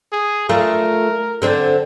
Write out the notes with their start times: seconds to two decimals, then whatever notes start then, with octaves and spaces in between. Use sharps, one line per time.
0.12 G#4
0.49 A3 D4 F4 A#4
1.42 D3 C4 D4